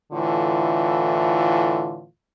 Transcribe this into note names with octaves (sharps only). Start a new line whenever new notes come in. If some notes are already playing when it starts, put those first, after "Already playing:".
A2 D3 E3 F4